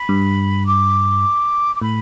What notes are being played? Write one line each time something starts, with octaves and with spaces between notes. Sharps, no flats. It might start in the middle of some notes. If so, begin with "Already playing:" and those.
Already playing: B5
G2
D6
D6
A2 B5